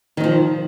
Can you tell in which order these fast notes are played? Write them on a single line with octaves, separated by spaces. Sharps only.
D#3 F#3 F3